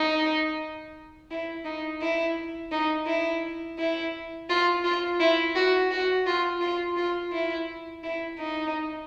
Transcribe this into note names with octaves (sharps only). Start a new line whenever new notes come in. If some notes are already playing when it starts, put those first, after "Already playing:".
Already playing: D#4
E4
D#4
E4
D#4
E4
E4
F4
F4
E4
F#4
F#4
F4
F4
F4
E4
E4
D#4